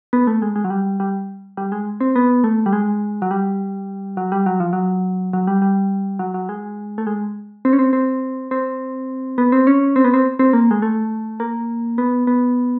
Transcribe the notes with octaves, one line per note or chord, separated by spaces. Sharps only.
B3
A3
G#3
G#3
F#3
G3
G3
G3
G#3
C4
B3
A3
G3
G#3
F#3
G3
F#3
G3
F#3
F3
F#3
F#3
G3
G3
F#3
F#3
G#3
A3
G#3
C4
C#4
C4
C4
C4
B3
C4
C#4
C4
B3
C4
C4
A#3
G#3
A3
A#3
B3
B3